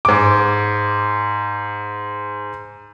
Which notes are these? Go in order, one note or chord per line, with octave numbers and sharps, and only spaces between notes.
G#2 D6